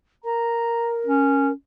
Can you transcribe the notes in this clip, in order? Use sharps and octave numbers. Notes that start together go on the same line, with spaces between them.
A#4 A#5
C#4